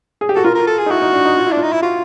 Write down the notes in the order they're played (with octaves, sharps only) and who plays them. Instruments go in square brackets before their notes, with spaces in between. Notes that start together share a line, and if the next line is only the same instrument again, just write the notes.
[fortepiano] G#4
G4
[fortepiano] F#4 [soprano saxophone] A4
[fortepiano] F4 [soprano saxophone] A#4
[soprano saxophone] A#4
A4
G#4
[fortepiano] D#4
[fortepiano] E4 [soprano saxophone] F#4
[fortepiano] D#4
D4
D#4
F4
E4
[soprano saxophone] D4
[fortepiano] F4
[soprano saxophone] D#4
E4
[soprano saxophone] F4 [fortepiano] F#4